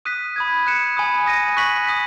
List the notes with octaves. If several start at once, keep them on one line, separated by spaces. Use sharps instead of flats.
D#6 F#6 B6 D#7
B5 D#6 G#6
F#6 C#7 E7
G#5 B5 D#6
D#6 A#6 D#7
C#6 F#6 B6 F#7
D#6 F#6 B6